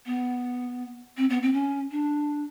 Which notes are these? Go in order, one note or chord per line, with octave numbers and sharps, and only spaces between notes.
B3
C4
B3
C4
C#4
D4